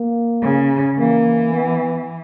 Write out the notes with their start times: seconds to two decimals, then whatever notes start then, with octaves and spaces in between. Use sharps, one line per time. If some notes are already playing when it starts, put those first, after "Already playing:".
Already playing: A#3
0.42 C#3
0.98 E3 A#3
1.54 B3